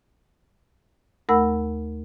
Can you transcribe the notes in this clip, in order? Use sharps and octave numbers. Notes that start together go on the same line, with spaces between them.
D#2 A3 A#4 F#5 B5 E6